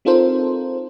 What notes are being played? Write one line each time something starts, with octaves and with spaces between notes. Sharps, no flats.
C4 D#4 F4 A4 A#4 C5